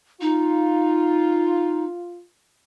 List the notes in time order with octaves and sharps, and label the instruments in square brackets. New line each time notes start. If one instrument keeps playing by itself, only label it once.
[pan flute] D#4 [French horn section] F4